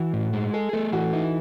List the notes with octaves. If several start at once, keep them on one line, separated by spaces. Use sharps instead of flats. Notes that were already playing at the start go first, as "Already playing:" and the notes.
Already playing: E3 F#4
A2
G#3
G#4 A4
A3 A4
E3 F#4
D#4 E4